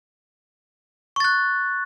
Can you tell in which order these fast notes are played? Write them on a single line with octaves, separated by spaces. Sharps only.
C#6 A6 F#6